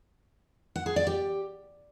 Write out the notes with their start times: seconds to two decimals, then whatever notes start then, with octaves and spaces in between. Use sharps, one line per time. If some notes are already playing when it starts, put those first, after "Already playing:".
0.76 F#5
0.86 G#4
0.96 D5
1.07 G4